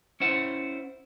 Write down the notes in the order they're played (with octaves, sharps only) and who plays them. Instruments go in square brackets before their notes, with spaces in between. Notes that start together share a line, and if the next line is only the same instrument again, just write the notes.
[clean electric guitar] C#4 E4 C5 F#5